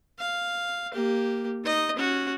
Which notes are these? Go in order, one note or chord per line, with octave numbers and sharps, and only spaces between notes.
F5
A#3 G4
D#4 D#5
C#4 F#4